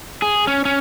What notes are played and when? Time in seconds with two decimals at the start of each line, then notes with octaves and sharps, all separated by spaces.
0.22 G#4
0.47 C#4
0.65 C#4